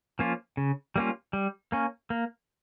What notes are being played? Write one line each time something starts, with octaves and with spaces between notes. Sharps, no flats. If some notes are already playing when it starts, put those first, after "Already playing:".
F3 A#3 C#4 F4
C#3
G3 A#3 C#4 F4
G3
A#3 C#4
A#3